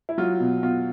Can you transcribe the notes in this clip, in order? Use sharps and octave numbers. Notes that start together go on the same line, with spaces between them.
E4
F#3 F4
B2
B2 F4